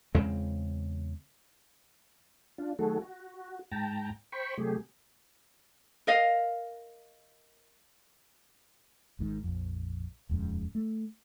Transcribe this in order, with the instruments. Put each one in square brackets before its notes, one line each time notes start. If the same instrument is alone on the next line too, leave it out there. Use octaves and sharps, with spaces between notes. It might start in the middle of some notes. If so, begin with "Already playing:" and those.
[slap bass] E2 C#3 G#3 C4
[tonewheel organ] D4 F4
D#3 F#3 A3 F#4 G#4 A4
F#4
G#2 G5 A5 A#5
C5 G5 B5 C#6
C3 F#3 A3 G4 G#4
[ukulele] A#4 D#5 F5
[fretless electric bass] G#1 G#2 D#3
A#1 F2
D#1 F2 G#2 C#3
A3